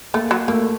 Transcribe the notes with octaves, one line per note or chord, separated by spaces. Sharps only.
A3 A#3
F#3
A3 A#3